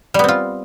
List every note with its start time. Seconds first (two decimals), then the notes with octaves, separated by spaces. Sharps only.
0.14 G3
0.19 B3
0.24 C4
0.28 F4